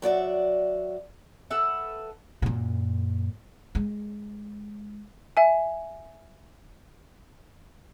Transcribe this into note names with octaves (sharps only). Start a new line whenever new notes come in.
F#3 F#4 D5 E5
A4 B4 E5 F#5
F#2 A#2
G#3
E5 G#5